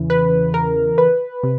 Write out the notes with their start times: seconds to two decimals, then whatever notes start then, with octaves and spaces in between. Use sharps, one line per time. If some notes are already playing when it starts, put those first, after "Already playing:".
Already playing: E2 C#3 E3
0.10 B4
0.54 A#4
0.98 B4
1.43 C3